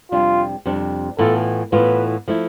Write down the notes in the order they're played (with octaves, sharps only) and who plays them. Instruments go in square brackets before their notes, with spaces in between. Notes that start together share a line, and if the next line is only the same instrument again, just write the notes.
[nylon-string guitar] F2 C3 G3 D4 [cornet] F4
[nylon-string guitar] F2 C3 G3 D4
[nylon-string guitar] A2 E3 B3 F4 [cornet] A4
[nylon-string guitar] A2 E3 B3 F4 [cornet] B4
[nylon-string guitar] F3 A3 E4